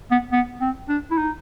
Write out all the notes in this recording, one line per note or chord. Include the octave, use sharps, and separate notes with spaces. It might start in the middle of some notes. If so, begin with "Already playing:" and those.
B3
B3
C4
D4
E4
D#4